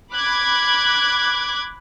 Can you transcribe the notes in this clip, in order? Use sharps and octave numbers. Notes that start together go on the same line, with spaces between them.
B5 D6 F#6 G#6